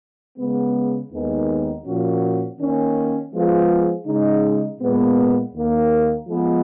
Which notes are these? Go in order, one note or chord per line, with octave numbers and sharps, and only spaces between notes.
C#3 G#3 B3
D#2 D#3 G#3 B3 D#4
A#2 F3 A#3 C#4 F#4
D#3 A#3 C#4
F3 G#3 B3 F4 G#4
C#3 G#3 D#4
A#2 G#3 B3
D#2 D#3 A#3
F3 G#3 B3